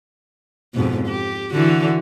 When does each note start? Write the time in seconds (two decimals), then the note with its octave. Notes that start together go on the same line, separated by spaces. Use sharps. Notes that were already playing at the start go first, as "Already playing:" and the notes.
0.74 F2 G#2 B2
1.08 G4
1.53 D3 E3 F#4